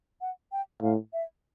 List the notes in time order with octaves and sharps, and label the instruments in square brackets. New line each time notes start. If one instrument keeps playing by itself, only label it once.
[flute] F#5
G5
[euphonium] A2 [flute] F5
[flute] E5